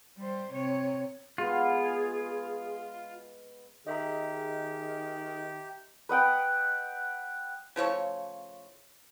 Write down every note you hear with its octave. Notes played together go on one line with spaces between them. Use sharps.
G3 C5
C3 C#5
G#3 B3 F4 G#4
D#3 G4 G#4 D#5 E5 A#5
B4 D#5 F#5 G5
C#3 F3 A3 C#5